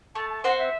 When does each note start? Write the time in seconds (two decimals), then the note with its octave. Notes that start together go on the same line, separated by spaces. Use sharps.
0.15 A3 A5
0.30 A5
0.44 C4 F#4 C5 F#5
0.58 E5